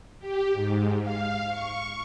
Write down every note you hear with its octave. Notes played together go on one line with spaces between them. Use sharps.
G4
G#2
F5
C#6